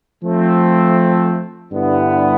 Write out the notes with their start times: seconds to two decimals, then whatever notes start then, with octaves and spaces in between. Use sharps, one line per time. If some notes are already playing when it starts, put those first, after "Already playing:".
0.24 F3 A3 C4
1.72 G2 D3 G3 B3 E4